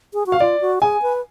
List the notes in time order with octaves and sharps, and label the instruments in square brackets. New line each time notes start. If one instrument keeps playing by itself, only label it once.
[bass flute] G#4
F#4
[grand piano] F5
[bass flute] F4 [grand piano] D5
[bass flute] F#4
[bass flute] G#4 [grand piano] G#5
[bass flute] B4